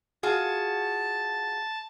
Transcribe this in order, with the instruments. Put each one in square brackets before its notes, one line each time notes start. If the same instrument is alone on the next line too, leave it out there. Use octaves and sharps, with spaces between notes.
[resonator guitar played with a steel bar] F4 F#4 G#4 [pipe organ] A5